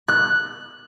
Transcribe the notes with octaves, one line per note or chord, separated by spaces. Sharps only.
F#6